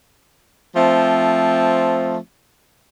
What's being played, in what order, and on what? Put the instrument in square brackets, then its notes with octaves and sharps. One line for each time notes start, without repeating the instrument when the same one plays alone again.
[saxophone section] F3 A3 C4